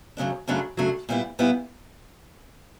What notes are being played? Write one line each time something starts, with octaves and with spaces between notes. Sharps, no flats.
F#2 C#3 F#3 A3 D4
F#2 C#3 F#3 A3 D4
F#2 C#3 F#3 A3 D4
A#2 G3 B3 E4
A#2 G3 B3 E4